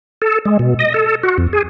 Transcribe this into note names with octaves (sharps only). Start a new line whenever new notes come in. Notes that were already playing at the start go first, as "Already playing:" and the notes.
A4
G#3
B2
D#5
A4
F#4
F2
G#4